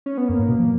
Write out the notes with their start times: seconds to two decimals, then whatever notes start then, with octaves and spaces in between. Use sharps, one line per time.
0.06 C#4
0.17 B3
0.28 F#2 A#3
0.39 G#2
0.48 B2
0.59 F3